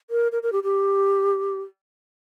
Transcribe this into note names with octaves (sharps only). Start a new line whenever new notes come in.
A#4
A#4
A#4
G4
G4